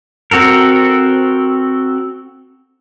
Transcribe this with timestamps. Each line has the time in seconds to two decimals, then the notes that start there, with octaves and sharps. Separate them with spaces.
0.31 C4 F#4 A4 A#4